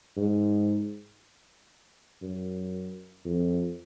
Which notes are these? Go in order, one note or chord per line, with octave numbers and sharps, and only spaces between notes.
G#2
F#2
F2